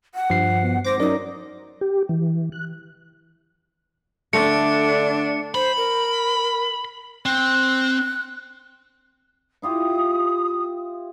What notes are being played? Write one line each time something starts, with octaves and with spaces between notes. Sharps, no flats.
F#5
G2 F3 C7
B2
G#1 C5 D6 A#6
F#2 D#4 A#4 D5
G4
E3
F#6
D3 A3 D4 C#7
C5 B5
A#4
C4 F#6
E4 F4 G4 D#6